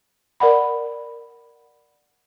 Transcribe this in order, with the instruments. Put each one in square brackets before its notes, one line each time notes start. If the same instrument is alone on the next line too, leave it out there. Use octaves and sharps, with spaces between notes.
[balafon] A#4 D5 F#5 B5